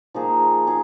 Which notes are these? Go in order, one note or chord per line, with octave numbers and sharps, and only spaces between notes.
F3 A#3 D#4 G#4
D#4 G#4